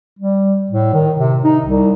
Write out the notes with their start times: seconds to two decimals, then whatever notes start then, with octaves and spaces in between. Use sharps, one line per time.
0.19 G3
0.70 A2
0.93 D#3
1.17 C3
1.44 D#4
1.65 C2